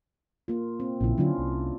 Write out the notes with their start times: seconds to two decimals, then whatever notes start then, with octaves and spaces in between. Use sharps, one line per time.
0.48 A#3 F4
0.80 C4
1.01 A#1 A#2 C#3 C#4 E4
1.18 D3 F#3 C#4 D4 F4
1.38 C2